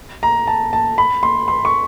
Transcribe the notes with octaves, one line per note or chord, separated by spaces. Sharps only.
A#5
A5
A5
B5
C6
C6
C#6